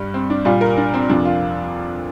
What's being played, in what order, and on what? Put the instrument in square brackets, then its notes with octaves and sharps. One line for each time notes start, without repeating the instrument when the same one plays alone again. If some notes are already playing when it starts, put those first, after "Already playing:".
Already playing: [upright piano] G2 G3
C4
D4
A#2 G3 F4
A#4
D4
C4
F2 C3 F3 D4
F4